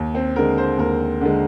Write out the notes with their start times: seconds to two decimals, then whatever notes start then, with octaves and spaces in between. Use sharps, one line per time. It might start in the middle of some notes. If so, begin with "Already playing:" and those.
Already playing: D#2
0.15 C4
0.36 D3 G#3 A#4
0.58 C5
0.78 D#2 A#4
1.21 D3 G#3